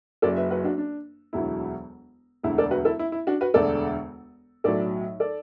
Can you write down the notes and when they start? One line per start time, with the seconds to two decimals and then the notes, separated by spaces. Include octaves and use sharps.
0.22 F#1 F#2 F#3 A4 D5
0.36 B4 E5
0.50 F#4 B4
0.64 D4 F#4
0.78 D4
1.33 E1 D2 D3 F#3 E4
2.43 E1 D2 D3 E4
2.58 A4 D5
2.71 F#4 B4
2.85 E4 A4
2.99 E4
3.12 E4
3.27 D4 F#4
3.41 F#4 B4
3.54 E1 D2 D3 A4 D5
4.64 B1 A2 F#3 A4 D5
5.20 A4 D5